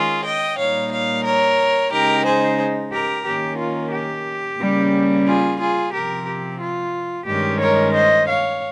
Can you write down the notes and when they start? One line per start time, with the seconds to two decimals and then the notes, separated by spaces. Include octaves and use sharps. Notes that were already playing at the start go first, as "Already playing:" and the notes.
Already playing: D#3 G#3 C#4 F4 G#4
0.24 D#5 G5
0.57 A#2 G3 A#3 D#4 C#5 F5
0.91 C#5 F5
1.24 A#4 C#5
1.92 C#3 G#3 D#4 G4 A#4
2.25 G#4 C5
2.92 G4 A#4
3.26 D#3 A#3 C#4 G4
3.59 F4
3.92 G4
4.60 C#3 G3 A#3 C#4
5.27 F4 G#4
5.60 F4 G#4
5.93 C3 F3 C4 G4 A#4
6.27 G4
6.61 F4
7.27 G2 D#3 G#3 C#4 G4
7.61 A#4 C#5
7.94 C5 D#5
8.28 C#5 F5